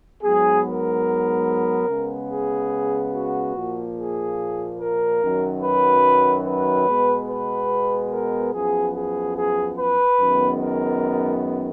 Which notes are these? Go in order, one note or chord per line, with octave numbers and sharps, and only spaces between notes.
G#2 F#3 B3 G#4
A#4
C#3 G#3 B3
G#4
F#4
A#2 F3 A#3
G#4
A#4
F#2 D#3 F#3
B4
B4
B2 G#3 B3
B4
A#4
F#2 F3 B3 G#4
G#4
G#4
B4
F#2 D#3 G#3 B3
A#4